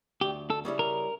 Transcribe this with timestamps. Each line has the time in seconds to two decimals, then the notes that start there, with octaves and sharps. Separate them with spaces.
0.21 D2 G4
0.50 A4
0.65 C#3 G3 C#4 E4
0.79 A#4